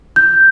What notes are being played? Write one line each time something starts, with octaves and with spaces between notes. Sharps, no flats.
G6